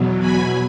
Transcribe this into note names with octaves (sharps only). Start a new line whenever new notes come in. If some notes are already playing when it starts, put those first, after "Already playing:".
Already playing: E2 B2 F#3
G#5 B5